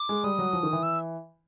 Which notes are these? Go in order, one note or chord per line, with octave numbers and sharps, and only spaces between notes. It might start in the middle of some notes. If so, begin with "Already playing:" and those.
Already playing: D6
G#3
G3 D#6
F#3
F3
D#3
E3
E6